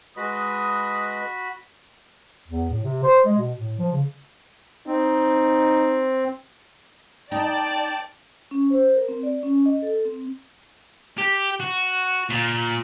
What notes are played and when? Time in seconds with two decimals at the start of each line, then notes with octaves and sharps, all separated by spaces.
0.17 G#3 F#4 B4 D#5 B5 D#6
2.47 E2
2.70 A2
2.83 C3
3.03 C5
3.25 G#3
3.37 B2
3.57 A2
3.78 F3
3.92 C#3
4.87 C4 D#4
7.32 D#4 D5 G5 A5
8.51 C#4
8.70 C5
8.95 A#4
9.09 C4
9.23 D5
9.43 C#4
9.66 D#5
9.82 A4
10.05 C4
11.18 G4
11.60 F#4
12.30 A#2